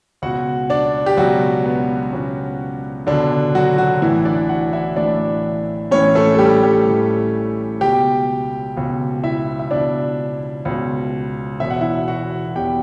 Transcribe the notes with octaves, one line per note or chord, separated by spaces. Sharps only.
C#2 B2 F#4 F#5
D4 D5
G4
C#2 B2 F#3 F#4
B3
C#2 B2 C#4
C#2 B2 D3 D4
F#3 F#4
F#3 F#4
A1 A2 E3 E4
D4 D5
F#4 F#5
E4 E5
A1 A2 E3 D4 D5
A1 A2 E3 C#4 C#5
A3 A4
A4
G3 G4
G3 G4
A1 A2 E3
C#2 B2 G4 G5
C#2 B2
E4 E5
E5
C#2 B2 D4 D5
C#2 B2
E1 E2 B2 E5
F#5
E4 E5
F#4 F#5
E2 B2 G4 G5